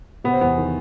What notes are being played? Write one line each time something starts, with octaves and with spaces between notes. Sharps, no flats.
C3 B3
C4
E2 B3
D#3